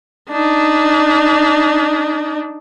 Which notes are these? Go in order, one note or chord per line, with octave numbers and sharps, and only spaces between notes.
D4 D#4